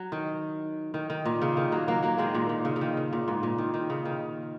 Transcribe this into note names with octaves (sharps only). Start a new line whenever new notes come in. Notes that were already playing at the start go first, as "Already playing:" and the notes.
Already playing: F#3
D#3
D#3
D#3
A#2
C#3
D#3
F#3 A#3
F#3 A#3
F#3 A#3
D#3 G#3
A#2
A#2
C#3
C#3
D#3
C#3
A#2
G#2
A#2
D#3
D#3
C#3
D#3